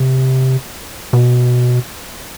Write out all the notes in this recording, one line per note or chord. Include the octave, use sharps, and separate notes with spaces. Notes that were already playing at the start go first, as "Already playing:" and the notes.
Already playing: C3
B2